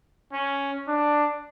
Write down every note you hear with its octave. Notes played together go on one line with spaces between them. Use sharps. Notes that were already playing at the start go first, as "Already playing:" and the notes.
C#4
D4